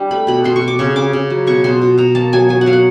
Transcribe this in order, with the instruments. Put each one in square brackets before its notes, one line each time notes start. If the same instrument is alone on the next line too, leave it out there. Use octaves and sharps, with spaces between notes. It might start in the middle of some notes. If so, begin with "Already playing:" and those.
Already playing: [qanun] G3 D4
A3 B5
B2 B5
B2 C6
C#6
B2
D6
C#3 C#6
C#3 D6
C#3
F#3
B2 C#6
B2 C6
B2
B2 A#5
A#3 A5
F#3 G#5
F#3 G#5
F#5
F#3 F5
F#5